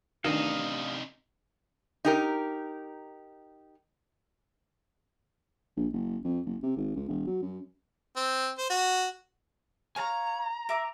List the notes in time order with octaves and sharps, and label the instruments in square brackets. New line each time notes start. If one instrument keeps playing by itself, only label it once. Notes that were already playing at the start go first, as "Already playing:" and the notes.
[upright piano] A1 D4 E7 [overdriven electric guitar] C3 D#4 [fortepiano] D#3 [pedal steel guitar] D#5 F5
[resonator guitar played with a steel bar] D#4 G4 A#4
[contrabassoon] A#1
F#1
F2
F#1
C3
G#1
C#2
E1
F#3
F#2
[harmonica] C4
C5
F#4
[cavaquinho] C#5 F5 [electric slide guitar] G#5 A#5
[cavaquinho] A#4 E5 D6